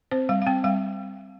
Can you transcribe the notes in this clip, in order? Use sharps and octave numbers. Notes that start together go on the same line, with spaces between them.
C4 C5
G3 F5
F5
C4 G5
G3 F5